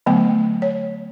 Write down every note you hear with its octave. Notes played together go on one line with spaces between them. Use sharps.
D3 F#3 A3 B3 G5
C#5